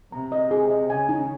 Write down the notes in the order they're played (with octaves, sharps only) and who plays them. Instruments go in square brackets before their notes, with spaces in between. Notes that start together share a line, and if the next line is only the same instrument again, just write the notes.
[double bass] C3 [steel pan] A#5
[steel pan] D#5
G#4
D#5
[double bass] C#3 [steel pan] G#5
[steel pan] D#4